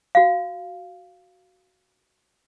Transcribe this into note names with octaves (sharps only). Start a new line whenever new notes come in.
F#4 F5